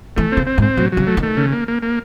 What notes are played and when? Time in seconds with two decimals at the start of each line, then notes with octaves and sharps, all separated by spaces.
0.17 E3 A3
0.32 C#3 C4
0.47 C4
0.58 G#2
0.62 C4
0.77 A2 F#3
0.92 C#3 F#3
1.07 A3
1.17 D#3
1.23 A3
1.37 C#3
1.52 A#3
1.68 A#3
1.83 A#3